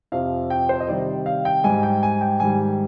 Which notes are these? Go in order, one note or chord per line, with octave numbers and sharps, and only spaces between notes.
F2 C3 F3 F5
G5
C5
D#5
C3 D#3 G3 D5
F5
G5
G#2 G3 G#5
G5
G#5
G5
G#2 D#3 G3 G#5